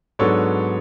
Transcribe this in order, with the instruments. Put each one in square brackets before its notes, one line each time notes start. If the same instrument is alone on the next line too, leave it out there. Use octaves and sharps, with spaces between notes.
[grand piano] G#2 F#3 B3 D4 A4 C#5